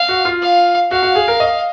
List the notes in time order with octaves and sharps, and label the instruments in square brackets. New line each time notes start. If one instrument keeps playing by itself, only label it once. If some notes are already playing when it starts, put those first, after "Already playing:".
Already playing: [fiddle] F5
[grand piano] F#4
F4
[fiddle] F5
[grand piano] F#4 [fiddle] F5
[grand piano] F#4
G#4
A#4
D#5